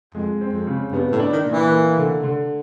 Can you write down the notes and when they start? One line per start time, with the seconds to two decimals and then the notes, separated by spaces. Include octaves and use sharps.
0.15 F2 G#3
0.41 C4
0.54 F2
0.67 C#3
0.92 G2 B3
1.12 A2
1.19 D4
1.33 D#3
1.45 A#2
1.51 E3
1.71 A#3
1.98 D3
2.23 D3